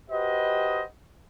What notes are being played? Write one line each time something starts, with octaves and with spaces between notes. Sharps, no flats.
F#4 G4 B4 C5 D#5